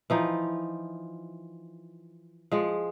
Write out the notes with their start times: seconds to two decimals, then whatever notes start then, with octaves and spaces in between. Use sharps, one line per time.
0.10 E3 F3 D#4
2.52 F3 G#3